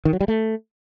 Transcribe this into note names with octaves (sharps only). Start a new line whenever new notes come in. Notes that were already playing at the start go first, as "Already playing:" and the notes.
D#3
F#3
G3
A3